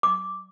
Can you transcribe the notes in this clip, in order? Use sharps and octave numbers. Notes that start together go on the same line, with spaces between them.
D6